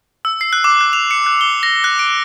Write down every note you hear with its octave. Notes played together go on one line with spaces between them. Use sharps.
E6
C7
F#6
D6
F#6
F7
C#7
F#6
G7
A#6
F#6
D7